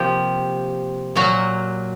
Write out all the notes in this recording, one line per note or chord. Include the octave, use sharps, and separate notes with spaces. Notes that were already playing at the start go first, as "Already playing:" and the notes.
Already playing: C3 F3 A#3 G4
A#2 F#3 A#3 F#4